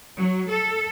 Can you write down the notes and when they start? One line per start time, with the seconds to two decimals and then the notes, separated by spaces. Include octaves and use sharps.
0.18 F#3
0.50 A4